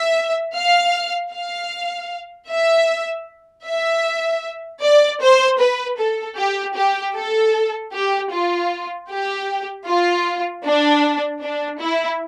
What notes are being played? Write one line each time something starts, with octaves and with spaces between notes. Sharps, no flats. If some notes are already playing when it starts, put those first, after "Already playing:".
Already playing: E5
F5
F5
E5
E5
D5
C5
B4
A4
G4
G4
A4
G4
F4
G4
F4
D4
D4
E4